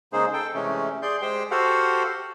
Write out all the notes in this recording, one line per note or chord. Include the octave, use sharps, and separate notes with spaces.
C#3 G#3 A#3 D#4 G#4 C5
A4 G5
C3 E3 G#3 A3 C#4
G#4 D5 C6 G6
G#3 G4 C5 G5
F#4 G4 A4 C5 F5 F#5